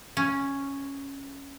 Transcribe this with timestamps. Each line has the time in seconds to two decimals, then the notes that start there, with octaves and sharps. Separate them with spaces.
0.17 C#4